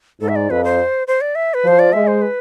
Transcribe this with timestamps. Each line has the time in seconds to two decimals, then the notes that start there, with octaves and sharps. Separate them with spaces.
0.21 G#2 A4
0.29 E5
0.36 D5
0.50 F2 B4
0.64 C5
1.08 C5
1.21 D5
1.35 E5
1.54 B4
1.64 F3 C5
1.79 D5
1.93 G#3 E5
2.07 C5
2.22 B4